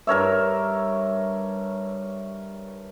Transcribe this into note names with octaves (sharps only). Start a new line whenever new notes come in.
G2 A#4 C#5 E5